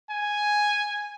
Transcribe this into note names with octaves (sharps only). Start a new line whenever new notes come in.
G#5